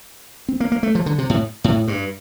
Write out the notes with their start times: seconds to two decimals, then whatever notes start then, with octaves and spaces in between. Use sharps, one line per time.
0.48 C4
0.60 A#3
0.72 A#3
0.83 A3
0.95 F3
1.06 D3
1.18 C3
1.30 A2
1.64 A2
1.88 G2